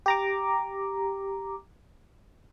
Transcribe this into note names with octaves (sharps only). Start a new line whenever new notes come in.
G4 A#5 D6